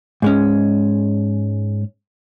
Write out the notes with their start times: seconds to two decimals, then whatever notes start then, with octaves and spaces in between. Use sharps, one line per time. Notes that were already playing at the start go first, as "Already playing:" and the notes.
0.22 G#2 G#3 C#4